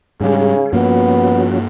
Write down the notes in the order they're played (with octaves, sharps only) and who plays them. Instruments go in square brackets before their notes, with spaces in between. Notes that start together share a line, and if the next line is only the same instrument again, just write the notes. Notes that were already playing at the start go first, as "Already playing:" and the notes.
[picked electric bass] G#2 G3 [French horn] C#3 [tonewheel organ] G#4
[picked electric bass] G2 A#3 [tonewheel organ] F3 C#4 F#4 [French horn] B3